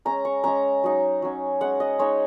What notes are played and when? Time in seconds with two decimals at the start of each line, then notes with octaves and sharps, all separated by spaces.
0.05 G#3 C#4 A#5
0.25 C#6
0.44 G#3 C#4 A#5
0.84 F#3 D#4
1.22 F#3 C#4
1.61 G#3 C#4 F#5
1.80 D#5
1.99 G#3 D#4 C#5